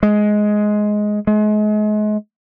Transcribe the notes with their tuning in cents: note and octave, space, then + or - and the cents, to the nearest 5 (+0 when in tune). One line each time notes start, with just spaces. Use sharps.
G#3 +10
G#3 +35